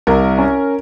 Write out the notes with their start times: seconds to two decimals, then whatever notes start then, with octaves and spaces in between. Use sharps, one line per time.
0.07 C2 A#4
0.39 C#4